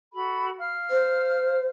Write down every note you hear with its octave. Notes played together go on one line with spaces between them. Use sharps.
F#4 A4 B5
F5 F6
C5